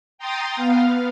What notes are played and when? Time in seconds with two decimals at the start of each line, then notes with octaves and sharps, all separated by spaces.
0.18 G5 A#5 C6 D#6 A6
0.55 B3 F5